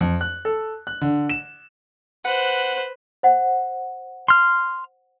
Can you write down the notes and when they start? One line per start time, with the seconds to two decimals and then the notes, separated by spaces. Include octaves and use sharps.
0.01 F2
0.21 F#6
0.45 A4
0.87 F#6
1.01 D3
1.29 E7
2.25 B4 C5 F#5
3.23 C5 F#5
4.28 C6 F6